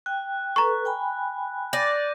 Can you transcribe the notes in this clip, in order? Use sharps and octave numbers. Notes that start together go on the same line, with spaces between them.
G5 F#6
A4 B4 A#5 C#6
G5 G#5 B5
D5 G6 A#6 D#7